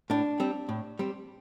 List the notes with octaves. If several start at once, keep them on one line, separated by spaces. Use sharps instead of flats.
A2 D4
G3 C4
A2
G3 C4